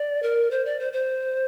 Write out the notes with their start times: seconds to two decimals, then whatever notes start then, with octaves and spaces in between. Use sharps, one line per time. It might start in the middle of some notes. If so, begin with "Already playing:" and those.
Already playing: D5
0.23 A#4
0.51 C5
0.65 D5
0.80 C5
0.93 C5